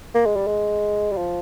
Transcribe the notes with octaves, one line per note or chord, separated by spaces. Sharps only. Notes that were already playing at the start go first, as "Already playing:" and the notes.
A#3
G#3
G3
G#3
G3
F3